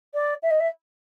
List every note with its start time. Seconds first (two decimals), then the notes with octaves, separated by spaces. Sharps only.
0.14 D5
0.43 E5
0.51 D#5
0.60 E5